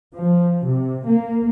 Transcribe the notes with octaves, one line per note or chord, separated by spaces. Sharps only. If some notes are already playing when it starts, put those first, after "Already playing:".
F3
C3
A#3